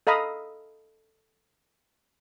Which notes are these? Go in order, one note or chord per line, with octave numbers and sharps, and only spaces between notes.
A4 D#5 F5 A#5 B5 D#6